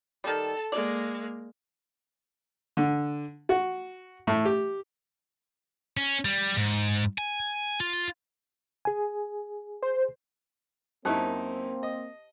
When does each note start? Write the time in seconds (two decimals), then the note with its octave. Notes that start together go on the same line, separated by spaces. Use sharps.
0.24 D#3 G3 A4 A5
0.72 G#3 A#3 D5
2.77 D3
3.49 F#4
4.27 A2
4.45 G4
5.97 C#4
6.25 G3
6.57 G#2
7.18 G#5
7.80 F4
8.85 G#4 G#5
9.83 C5
11.05 F#2 A#3 C4 D#4 E4 G4 C5 A5
11.83 D#5